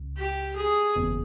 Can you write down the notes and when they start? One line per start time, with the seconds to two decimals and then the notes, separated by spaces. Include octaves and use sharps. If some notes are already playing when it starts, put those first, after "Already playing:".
Already playing: C#2
0.17 G4
0.56 G#4
0.96 F#1 E2 B2